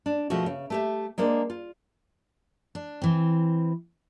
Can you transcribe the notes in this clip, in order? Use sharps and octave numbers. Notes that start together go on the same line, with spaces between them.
D4
B2 F3 G#3 A3 B3 F#4
C#3
A3 G4 E5
G#3 A#3 D4 C5
F4
D4
E3 C4